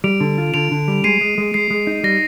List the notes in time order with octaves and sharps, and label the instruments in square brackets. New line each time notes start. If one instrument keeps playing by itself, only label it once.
[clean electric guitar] G3 [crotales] D7 F7
[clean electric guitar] D3
F4
[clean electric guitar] D3 [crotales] D7 F7
[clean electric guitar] D3
G3
[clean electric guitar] G#3 [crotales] C7 D#7
[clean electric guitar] G#3
G#3
[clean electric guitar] G#3 [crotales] C7
[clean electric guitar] G#3
D#4
[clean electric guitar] G3 [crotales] A#6